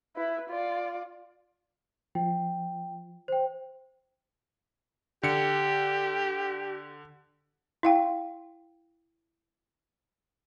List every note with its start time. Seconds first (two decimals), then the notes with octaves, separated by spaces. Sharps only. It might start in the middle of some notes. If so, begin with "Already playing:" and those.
0.16 E4 B4
0.49 F4 D5
2.15 F3 G5
3.28 C5 G5
5.23 D3 G4 C#7
7.83 E4 F5 G5